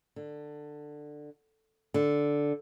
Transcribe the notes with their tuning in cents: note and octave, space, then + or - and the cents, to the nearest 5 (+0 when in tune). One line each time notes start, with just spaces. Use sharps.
D3 +15
D3 -5